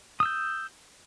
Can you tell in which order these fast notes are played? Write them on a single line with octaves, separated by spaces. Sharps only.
D#6 E6 G6